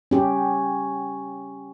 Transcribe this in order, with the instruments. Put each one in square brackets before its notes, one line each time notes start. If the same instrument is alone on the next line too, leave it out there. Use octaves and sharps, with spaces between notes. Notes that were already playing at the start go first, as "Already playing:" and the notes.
[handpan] C#4 G4